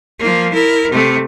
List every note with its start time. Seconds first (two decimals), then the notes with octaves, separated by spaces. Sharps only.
0.20 F3 A#3
0.54 E4 A#4
0.91 C3 A3